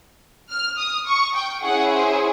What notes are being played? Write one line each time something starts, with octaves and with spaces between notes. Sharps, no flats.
F6
D#6
C#6
G5
C#4 E4 G#4 F#5
C5